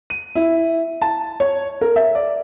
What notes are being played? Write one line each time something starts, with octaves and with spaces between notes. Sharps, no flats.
D#7
E4
A5
C#5
A#4
E5
D5